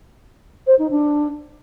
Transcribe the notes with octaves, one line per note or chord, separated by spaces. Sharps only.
C5
D#4
D4